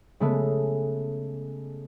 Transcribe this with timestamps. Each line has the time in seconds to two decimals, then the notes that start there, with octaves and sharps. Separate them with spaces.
0.20 C#3 G#3 A3 B3